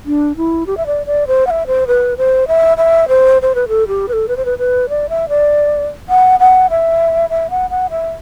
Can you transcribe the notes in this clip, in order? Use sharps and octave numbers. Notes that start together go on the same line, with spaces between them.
D4
E4
G4
E5
D5
D5
C5
F#5
E5
C5
B4
C5
E5
E5
C5
C5
B4
A4
G4
B4
A4
B4
C5
B4
B4
D5
E5
D5
F#5
F#5
E5
E5
F#5
F#5
E5